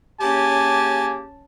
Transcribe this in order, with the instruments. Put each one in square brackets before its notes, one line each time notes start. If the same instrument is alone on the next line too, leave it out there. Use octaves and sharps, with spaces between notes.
[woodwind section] C#3 A#3 G4 [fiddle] C#4 A5 [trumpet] G#5